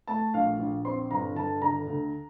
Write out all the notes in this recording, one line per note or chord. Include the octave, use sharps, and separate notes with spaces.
A3 A5
A#1 F5
A#1
C4 C6
G1 A#5
G1 A5
D3 A#5
D2